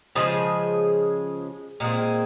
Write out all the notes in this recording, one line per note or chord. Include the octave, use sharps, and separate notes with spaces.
C#3 F3 G#3 G#4 C5
A#2 G#3 C4